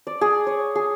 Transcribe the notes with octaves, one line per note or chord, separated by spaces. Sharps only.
D5
G#4
C#5
G#4